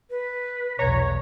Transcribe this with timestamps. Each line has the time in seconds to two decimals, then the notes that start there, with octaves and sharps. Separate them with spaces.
0.10 B4
0.79 B1 E2 C#5 A#5